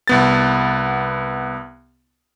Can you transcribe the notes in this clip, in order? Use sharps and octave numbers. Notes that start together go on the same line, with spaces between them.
C2 B3 A6